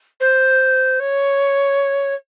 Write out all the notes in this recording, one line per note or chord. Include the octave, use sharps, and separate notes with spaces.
C5
C#5